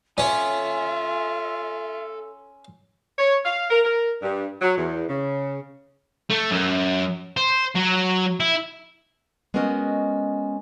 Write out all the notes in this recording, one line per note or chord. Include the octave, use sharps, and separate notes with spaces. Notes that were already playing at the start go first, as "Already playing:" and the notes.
C#4 F4 A4 E5 G#5
C#5
F5
A#4
A#4
G2
F#3
E2
C#3
A3
F#2
C5
F#3
E4
G#3 B3 C#4 F#4 A#4 D#5